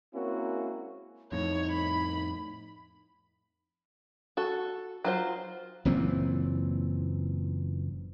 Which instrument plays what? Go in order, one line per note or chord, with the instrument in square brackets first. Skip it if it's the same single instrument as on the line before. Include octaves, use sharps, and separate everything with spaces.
[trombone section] G#3 A#3 C4 C#4 E4 F#4
[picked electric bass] F2 A2 [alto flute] D#4 [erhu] C#5
[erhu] B5
[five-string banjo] F#4 A4
F#3 F4 C5
[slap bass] F#1 A#2 E3 C4